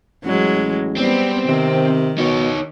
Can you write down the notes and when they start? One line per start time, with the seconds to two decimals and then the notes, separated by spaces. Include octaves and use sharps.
0.24 A1 F#3 G#3
0.98 G3 B3 C4
1.49 C3 D#3
2.19 B2 D#4 C#5